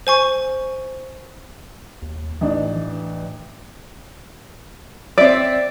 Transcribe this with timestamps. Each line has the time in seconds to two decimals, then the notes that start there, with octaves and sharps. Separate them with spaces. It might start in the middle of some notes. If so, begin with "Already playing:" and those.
0.07 C5 G#5 C#6
2.02 D#2
2.41 A1 E3 D4 D#4
2.76 E3
5.18 C4 D5 E5